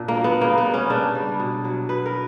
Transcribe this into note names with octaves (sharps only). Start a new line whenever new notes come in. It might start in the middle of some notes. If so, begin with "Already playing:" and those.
Already playing: A#2 D4
A#3
F#3
B3
C#3 A#3
B3
G3
C#4
C#3 D4
G3
B2
F#3
B2 B4
A#4